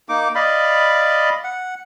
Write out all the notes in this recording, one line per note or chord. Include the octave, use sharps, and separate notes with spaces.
A#3 D#4 D6
D5 D#5 F5 B5
F#5